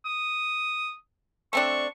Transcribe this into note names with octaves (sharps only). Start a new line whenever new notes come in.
D#6
A3 C4 D4 C#6